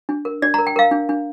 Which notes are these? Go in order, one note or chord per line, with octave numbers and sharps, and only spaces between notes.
D4
A#4
D4 D5
A#5
A#4
G5
A#4 F5
D4
D4